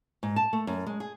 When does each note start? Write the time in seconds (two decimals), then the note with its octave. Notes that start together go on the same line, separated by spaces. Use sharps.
0.23 G#2
0.36 A5
0.53 A3
0.67 F#2
0.86 G#3
1.00 G#4